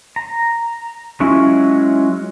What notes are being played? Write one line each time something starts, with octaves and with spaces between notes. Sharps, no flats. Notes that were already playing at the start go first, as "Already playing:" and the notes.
A#5
F#3 G#3 C#4 E4 F4